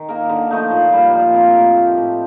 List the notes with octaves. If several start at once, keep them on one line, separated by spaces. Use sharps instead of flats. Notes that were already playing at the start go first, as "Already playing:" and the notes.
Already playing: D#3
A#3 D#4 A#4
D3
F3 A3 D#4
A#2
G3 A#3
F3
C4 F4 A#4
A2
A3 C4 G4
A2